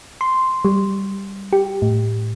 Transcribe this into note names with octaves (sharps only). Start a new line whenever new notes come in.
C6
G3
G4
A2